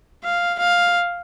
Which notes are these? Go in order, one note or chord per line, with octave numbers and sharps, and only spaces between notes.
F5
F5